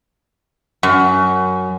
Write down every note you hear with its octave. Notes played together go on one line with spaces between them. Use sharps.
F#2